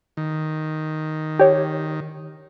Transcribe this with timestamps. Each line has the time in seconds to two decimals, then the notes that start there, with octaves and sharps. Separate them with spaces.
0.17 D#3
1.39 G4 C#5